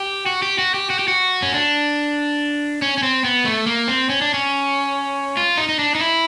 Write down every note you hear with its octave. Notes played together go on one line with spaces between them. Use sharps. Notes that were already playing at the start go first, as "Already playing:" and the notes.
Already playing: G4
F#4
G4
F#4
G4
F#4
G4
F#4
C#4
D4
C#4
C#4
C4
B3
A3
A#3
C4
C#4
D4
C#4
F4
D#4
D#4
D4
D#4
E4